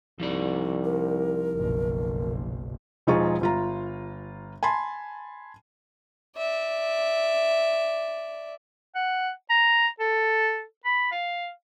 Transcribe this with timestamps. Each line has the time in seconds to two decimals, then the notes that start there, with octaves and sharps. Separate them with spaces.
0.20 C2 F3 D#4 D5
0.84 A#4
1.55 F#1 B1
3.07 E1 F3 D#4 F4 G#4 C#6
3.41 G1 F4 A#5
4.63 G#5 A5 B5 C6
6.37 D5 E5
8.95 F#5
9.49 A#5
10.00 A4
10.85 B5
11.11 F5